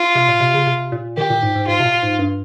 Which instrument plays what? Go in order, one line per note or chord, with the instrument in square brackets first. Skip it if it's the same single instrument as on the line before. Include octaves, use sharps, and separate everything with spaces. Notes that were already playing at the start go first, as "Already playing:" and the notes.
Already playing: [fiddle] F4
[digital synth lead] C3
A#2
C3
C#3
C3
A#2
[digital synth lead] D#3 [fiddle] G4
[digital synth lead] A#2
G#2
G#2
[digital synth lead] G#2 [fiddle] F4
[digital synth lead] C3
A#2
G#2
G2